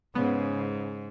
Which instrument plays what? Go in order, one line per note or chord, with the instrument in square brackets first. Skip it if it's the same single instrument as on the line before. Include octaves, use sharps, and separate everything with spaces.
[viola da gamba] G#2 [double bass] C#3 [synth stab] B3